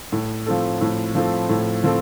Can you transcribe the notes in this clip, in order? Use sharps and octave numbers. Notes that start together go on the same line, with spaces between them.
A2
F3 C4 A4
A2
F3 C4 A4
A2
F3 C4 A4